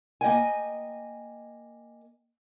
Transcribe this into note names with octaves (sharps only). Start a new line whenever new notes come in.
A#3 D#5 G5 G#5